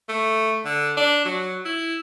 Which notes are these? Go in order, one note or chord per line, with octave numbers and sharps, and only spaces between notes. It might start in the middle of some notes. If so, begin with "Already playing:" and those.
A3
D3
D4
F#3
E4